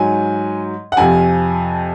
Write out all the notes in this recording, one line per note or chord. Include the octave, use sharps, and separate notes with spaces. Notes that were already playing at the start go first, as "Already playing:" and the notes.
Already playing: G#2 F#3 G#5
F#5
F2 C3 F3 G#5